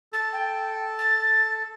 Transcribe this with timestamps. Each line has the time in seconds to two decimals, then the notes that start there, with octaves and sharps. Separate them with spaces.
0.13 A4 A6
0.32 G5
0.98 A6